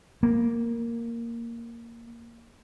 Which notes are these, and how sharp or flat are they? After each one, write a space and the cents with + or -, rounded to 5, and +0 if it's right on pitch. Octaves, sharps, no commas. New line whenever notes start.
A#3 -5